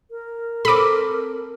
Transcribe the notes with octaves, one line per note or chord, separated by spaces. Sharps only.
A#4
C4 A4 B5 D6